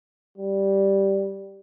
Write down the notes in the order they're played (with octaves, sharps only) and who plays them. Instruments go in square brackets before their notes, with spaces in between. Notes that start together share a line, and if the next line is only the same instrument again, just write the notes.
[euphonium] G3